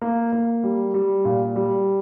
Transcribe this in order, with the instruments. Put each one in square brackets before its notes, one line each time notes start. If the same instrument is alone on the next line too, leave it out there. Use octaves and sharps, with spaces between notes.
[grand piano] A#3
A#3
G3
G3
A#2
G3